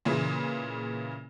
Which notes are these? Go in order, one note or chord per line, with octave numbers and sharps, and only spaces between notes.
A#2 C#3 E3